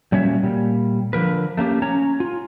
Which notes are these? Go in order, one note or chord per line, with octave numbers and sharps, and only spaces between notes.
A#2 G3 C#4 F#4 C#5 E5
A#2 G3
D3 F3 A#4 B4
A3 A#3 C#4 G4
C#4 C#5 A#5
F4